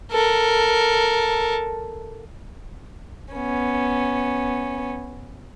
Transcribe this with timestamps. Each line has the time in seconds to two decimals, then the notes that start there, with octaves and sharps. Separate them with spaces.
0.12 A4 A#4
3.33 B3 C#4